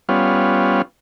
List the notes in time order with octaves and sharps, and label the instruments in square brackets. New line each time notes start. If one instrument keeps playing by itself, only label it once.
[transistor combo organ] G3 B3 C#4 F4